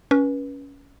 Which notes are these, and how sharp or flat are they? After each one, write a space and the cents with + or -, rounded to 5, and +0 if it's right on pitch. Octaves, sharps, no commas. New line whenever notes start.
C#4 +10 B4 -30